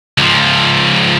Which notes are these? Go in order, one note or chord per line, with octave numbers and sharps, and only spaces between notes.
C#2 F3